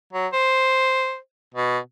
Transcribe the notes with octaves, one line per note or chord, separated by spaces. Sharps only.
F#3
C5
B2